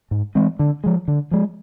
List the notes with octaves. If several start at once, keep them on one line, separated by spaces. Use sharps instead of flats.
G#2
E3 G#3 C4
D3
F3 G#3
D3
F3 G#3